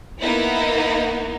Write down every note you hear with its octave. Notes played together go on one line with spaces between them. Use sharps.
A#3 B3 D#4 E4